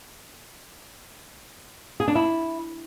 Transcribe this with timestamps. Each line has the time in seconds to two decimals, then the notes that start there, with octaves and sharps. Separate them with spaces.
2.00 G#4
2.08 D4
2.15 E4